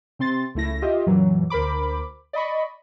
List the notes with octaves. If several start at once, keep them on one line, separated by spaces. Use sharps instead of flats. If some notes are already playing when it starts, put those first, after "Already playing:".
C3 C4 C6 A6
C#2 A3 E4 A#6
F4 G4 D#5 E5
F#2 A#2 E3 F#3
D2 A#4 C5 B5 D6
D5 D#5 B5 C#6